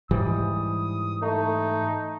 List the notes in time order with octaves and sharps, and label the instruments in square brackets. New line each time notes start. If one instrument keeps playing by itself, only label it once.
[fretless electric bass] G#2 E3 G3 [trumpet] D#6
[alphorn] A3 [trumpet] D#4